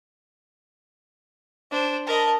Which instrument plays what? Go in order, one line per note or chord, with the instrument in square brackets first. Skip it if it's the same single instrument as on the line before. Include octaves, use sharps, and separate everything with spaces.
[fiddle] D4 C5
[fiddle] A#4 D#5 [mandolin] A5 B5